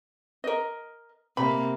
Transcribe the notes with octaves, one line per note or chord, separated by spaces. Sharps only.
A#4 D#5
C3 A#3 B5